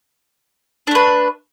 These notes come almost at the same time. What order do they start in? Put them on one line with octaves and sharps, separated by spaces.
D4 A3 B4